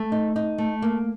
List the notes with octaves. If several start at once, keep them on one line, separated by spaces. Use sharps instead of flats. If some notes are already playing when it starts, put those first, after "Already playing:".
Already playing: A3
D#4
D#4
A3
A#3